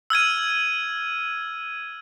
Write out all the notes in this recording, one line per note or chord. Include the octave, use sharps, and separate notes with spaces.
E6 F6 G#6 D#7